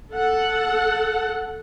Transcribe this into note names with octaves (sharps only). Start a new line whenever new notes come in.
A4 F#5